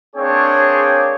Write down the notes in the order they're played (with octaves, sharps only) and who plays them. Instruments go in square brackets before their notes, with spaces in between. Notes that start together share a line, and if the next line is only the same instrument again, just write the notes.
[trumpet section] A#3 C4 D4 G#4 C#5 G5